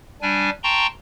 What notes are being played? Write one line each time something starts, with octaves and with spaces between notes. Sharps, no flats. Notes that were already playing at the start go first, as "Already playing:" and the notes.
G3 D4 G#5
G5 A5 A#5 C6 C#6